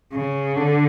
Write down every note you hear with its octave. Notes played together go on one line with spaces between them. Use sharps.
C#3
D3